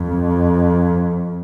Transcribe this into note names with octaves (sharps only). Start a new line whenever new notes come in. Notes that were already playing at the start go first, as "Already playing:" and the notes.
Already playing: F2